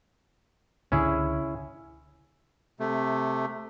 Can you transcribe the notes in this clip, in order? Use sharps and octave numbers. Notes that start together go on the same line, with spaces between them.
C#2 D3 C#4 E4 G#4
C3 A3